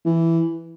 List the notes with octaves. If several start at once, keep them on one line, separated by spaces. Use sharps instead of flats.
E3